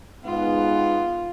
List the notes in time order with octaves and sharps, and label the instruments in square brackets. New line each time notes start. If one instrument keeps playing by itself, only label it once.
[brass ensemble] G#2 B3 [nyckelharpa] F4